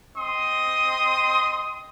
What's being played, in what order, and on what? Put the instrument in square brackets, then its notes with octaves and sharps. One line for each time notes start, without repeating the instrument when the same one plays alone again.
[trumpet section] C4 D#5 C6 D#6